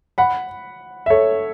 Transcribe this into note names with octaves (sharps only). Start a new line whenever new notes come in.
F#5 B5
E5
A4 C#5